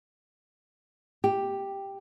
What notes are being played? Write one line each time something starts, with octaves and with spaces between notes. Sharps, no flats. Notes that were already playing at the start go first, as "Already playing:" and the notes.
G4